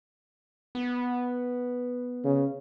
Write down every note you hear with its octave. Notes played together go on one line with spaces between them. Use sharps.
B3
C#3